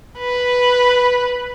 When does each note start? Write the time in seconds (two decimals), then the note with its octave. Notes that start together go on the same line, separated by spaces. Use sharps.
0.19 B4